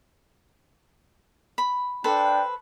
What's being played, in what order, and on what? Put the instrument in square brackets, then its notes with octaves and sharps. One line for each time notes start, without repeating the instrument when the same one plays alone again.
[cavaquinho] B5
[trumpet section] D4 G5 [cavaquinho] A4 B4 C5